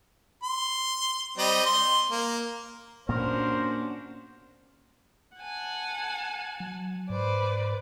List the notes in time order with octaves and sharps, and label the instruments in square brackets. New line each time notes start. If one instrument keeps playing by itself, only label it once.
[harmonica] C6
G3 C4 D#5
C6
A#3
[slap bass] A#2 A#3 B3 [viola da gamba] C#4 D4 F#4 [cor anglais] A#4 [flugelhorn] C5
[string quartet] F#5 G#5 A5
[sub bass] F#3
[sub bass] G#2 [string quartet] B4 C5 D5